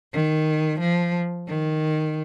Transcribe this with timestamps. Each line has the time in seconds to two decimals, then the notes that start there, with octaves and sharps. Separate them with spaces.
0.13 D#3
0.80 F3
1.47 D#3